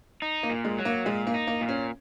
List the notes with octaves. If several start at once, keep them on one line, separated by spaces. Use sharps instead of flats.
D#4
A#3
A#2
G#3
F#3
A#3
A#2 G#3
A#3
D#4
A#3
A#2
C#4